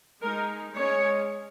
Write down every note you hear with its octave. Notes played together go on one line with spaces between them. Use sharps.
G#3 D#4 A#4
G#3 C#4 C#5